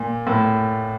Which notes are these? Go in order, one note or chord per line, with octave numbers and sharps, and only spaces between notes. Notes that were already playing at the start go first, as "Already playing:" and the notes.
Already playing: A#2
A2